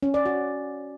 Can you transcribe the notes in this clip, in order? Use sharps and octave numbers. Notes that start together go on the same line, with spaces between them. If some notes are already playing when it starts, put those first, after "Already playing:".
C#4
D5
F#4